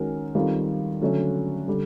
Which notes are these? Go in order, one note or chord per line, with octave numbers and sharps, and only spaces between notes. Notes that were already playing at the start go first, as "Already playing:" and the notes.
Already playing: D#3 G#3 C#4 F#4 A#4
D#3 G3 C4 F4 A4
D3 F#3 A3 C#4
D3 G3